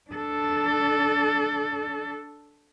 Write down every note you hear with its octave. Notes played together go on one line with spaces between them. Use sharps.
D4 A4